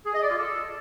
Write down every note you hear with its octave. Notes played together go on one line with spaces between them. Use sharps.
G#4
D#5
D5
F4
A4